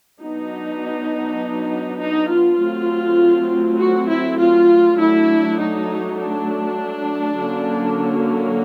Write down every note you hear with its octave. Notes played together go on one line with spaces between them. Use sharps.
F#3 B3 D4 D#4
D#4
F4
F#3 A3 C4
F#4
E4
F4
F#3 A3 D4 E4
D#4
D4
D3 F#3 A#3 C#4